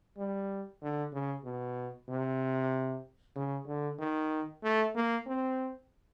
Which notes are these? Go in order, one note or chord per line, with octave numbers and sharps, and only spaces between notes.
G3
D3
C#3
B2
C3
C#3
D3
D#3
A3
A#3
C4